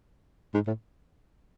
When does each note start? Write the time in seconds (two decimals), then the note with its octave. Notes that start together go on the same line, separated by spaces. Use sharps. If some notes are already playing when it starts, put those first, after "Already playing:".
0.55 G#2
0.67 A2